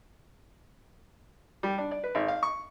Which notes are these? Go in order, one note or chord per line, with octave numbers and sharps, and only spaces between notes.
G3
D4
D5
B4
G#1
F5
C#6